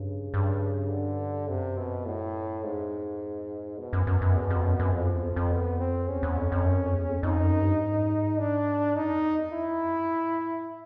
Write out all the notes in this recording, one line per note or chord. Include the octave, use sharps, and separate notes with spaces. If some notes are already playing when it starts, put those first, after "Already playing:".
Already playing: G2 C#3
G2
D3
F#2 C3
B2
A2
F2 G#2
F#2 B2
F#2
F#2
F#2
E2
F2
F#2
F#2
F2 F3
E2
F2
F2
B3
C4
E2 C#4
E2
F2
F2
F#2
F2
E2
F2
F2 D#4
F#2
G2
G#2
D4
G2 D#4
F2
E2
F2
E2 E4
F2
F#2
G2
A2